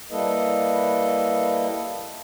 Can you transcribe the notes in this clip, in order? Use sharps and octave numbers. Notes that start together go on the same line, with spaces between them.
G3 A#3 E4 A4 B4 D#5